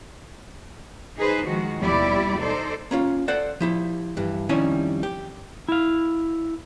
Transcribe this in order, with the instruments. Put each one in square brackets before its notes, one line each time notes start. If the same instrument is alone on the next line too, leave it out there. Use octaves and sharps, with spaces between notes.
[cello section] D#4 G#4 B4 C5
D#3 F3 G#3 F#4
D#2 B2 G3 E4 G4 D5
D#4 A4 C5 D5
[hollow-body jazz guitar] A#3 C#4 F4
A4 C5 D5 F#5
F3 E4 G4
G2 E3
F2 D#3 G3 C#4 E4 G#5
G4
[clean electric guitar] E4 F5